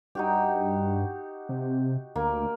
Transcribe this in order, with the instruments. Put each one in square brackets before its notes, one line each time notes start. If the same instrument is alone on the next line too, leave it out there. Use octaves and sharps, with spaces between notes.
[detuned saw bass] G2 [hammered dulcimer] D#4 F#4 G4
[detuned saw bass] C3
[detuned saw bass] D2 [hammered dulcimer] A#3